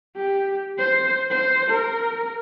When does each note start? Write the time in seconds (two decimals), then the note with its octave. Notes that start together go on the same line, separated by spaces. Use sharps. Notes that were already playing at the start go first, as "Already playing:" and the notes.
0.16 G4
0.79 C5
1.30 C5
1.71 A#4